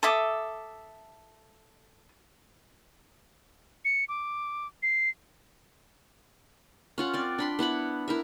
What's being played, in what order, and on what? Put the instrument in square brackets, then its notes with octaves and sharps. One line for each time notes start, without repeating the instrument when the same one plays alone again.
[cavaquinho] A4 E5 D6 D#6
[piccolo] C#7
D6
C7
[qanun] C#4 F4 F#5
C4 D5
D4 B5 C6
B3 E4 F#5 B5
E4 A#4 E5